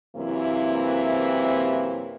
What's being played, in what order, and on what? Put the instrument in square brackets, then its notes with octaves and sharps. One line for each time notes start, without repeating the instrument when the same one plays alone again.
[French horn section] F#2 C3 E3 A#3 C4 E4